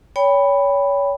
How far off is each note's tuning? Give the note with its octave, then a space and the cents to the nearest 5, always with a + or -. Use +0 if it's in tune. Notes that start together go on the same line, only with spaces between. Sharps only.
C#5 +30 G5 +20 B5 +0